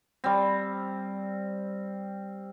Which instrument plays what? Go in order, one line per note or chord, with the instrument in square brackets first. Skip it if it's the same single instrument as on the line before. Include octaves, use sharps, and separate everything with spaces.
[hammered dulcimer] G3 C4